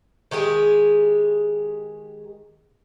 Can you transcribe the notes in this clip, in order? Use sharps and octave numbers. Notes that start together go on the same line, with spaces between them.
D#3 G#3 G4 G#4